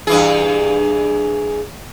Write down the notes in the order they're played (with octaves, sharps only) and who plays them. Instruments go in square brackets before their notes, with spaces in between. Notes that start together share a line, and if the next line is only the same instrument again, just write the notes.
[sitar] G2 E3 G#4